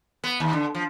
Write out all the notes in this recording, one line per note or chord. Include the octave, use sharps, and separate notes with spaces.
B3
D#2
D3
F3